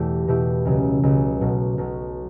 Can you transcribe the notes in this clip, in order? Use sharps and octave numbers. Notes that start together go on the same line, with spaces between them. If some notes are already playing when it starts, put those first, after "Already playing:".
Already playing: E2 B2 A3 E4 G4
B2 A3 E4 G4
C#2 C#3 F#3
C#2 C#3 F#3
B1 B2 F#3
B1 B2 F#3